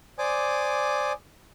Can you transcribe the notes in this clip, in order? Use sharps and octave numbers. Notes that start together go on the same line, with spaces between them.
C5 D5 G#5 D6 D#6